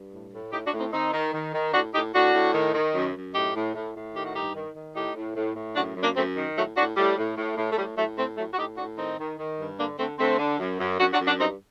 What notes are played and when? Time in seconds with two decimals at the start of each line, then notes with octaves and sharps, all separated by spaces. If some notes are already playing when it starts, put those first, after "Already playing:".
Already playing: G2
0.12 A2
0.33 A2
0.53 A2 D#4 G4
0.66 D4 F#4
0.73 A2
0.79 C4 D#4
0.93 D#3 C4 D#4
1.13 D#3
1.33 D#3
1.54 D#3
1.74 A2 D4 F#4
1.94 A2 D#4 G4
2.13 A2 D4 F#4
2.34 A2
2.54 D#3
2.74 D#3
2.94 F#2
3.15 F#2
3.34 A2 D#4 G4
3.55 A2
3.75 A2
3.95 A2
4.15 D#3 G4
4.25 F#4
4.35 G2 D#4 G4
4.55 D#3
4.75 D#3
4.95 A2 D#4 G4
5.15 A2
5.36 A2
5.56 A2
5.76 F#2 D4 F#4
5.96 F#2
6.03 A#3 D4
6.16 F#2 A3 C4
6.37 D#3
6.56 A2 F#3 A3
6.77 A2 D4 F#4
6.97 A2 G3
7.17 A2
7.37 A2
7.57 A2
7.72 A3
7.77 A2 G3
7.98 A2 F#3 A3
8.17 A2 A3 C4
8.37 A2 F#3 A3
8.53 F#4
8.57 A2 D#4 G4
8.78 A2 D4 F#4
8.98 D#3 C4 D#4
9.19 D#3
9.39 D#3
9.59 G2
9.79 D3 A#3 D4
9.99 D3 A3 C4
10.19 D3 A3 C4
10.39 D3
10.59 F#2
10.80 F#2
10.99 F#2 D4 F#4
11.13 D4 F#4
11.20 F#2
11.27 D4 F#4
11.39 G2 C4 D#4